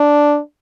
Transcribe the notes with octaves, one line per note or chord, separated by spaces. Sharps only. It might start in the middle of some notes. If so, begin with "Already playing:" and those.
Already playing: D4